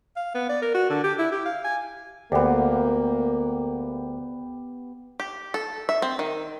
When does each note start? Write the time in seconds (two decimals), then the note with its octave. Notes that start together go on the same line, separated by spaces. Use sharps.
0.16 F5
0.35 B3
0.50 D5
0.62 A#4
0.75 F#4
0.90 D3
1.04 G4
1.19 E4
1.32 G4
1.46 F5
1.65 G#5
2.32 D2 A#3 B3 G4
5.20 G4
5.54 A4
5.89 E5
6.02 C4
6.19 D#3